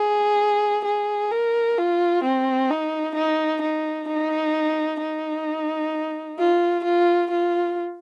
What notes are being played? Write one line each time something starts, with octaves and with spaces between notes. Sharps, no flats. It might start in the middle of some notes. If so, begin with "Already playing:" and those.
Already playing: G#4
G#4
A#4
F4
C4
D#4
D#4
D#4
D#4
D#4
F4
F4
F4